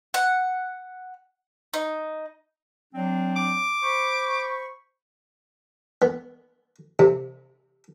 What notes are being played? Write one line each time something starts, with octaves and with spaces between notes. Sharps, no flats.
F#5
D#4
F#3 C4 D4
D6
C5 B5 C#6
B3
C3